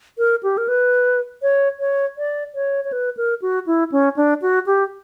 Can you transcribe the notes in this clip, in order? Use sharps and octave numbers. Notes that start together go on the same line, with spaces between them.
A#4
G4
A#4
B4
C#5
C#5
D5
C#5
C#5
B4
A#4
F#4
E4
C#4
D4
F#4
G4